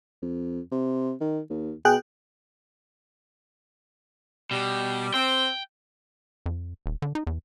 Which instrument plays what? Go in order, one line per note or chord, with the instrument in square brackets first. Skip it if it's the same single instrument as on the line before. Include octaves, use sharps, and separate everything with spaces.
[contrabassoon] F2
C3
D#3
D#2
[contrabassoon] B2 [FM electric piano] G#4 G5 F#6
[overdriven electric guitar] B2 [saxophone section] G3
[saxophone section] C4 [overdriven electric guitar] G5
[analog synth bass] F2
D#1
D3
D#4
E2